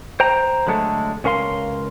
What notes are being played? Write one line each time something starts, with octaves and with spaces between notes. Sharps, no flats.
C5 G5 A#5
D3 F#3 G#3 A3 A4
C#2 C#4 A#4 F5 C6